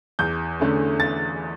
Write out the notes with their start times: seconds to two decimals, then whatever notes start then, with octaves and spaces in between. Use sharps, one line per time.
0.19 E2 G6
0.60 D3 A3 C#4
1.00 A6